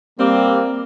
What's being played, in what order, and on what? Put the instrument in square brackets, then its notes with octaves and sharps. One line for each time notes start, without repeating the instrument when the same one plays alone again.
[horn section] G3 C4 [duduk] A#3